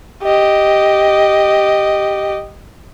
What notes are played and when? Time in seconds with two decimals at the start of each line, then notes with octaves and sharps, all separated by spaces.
0.23 G4 D#5